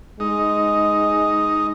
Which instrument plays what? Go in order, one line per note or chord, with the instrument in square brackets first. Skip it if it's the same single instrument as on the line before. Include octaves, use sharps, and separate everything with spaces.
[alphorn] G#3 [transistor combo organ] D#4